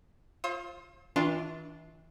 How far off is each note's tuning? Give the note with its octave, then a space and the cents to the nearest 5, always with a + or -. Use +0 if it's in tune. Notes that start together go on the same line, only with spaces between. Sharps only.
F4 +0 C5 +40 E6 -45
E3 -35 D4 +0 F4 +0